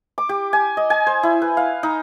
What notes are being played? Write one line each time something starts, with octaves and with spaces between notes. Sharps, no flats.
D6
G4
G#5
D#5
G#5
C5
E4
B4
F5
D#4